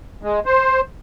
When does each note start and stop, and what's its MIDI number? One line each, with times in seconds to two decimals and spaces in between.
0.23 0.40 56
0.46 0.81 72